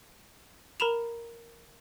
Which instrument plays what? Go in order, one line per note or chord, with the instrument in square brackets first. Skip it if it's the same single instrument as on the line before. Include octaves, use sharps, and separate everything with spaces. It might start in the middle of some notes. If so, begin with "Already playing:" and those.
[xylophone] A#4 A#5 B5 E7 F7